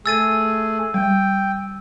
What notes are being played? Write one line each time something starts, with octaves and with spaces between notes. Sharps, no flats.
A3 G#4 E6 A6 D#7
G3 G5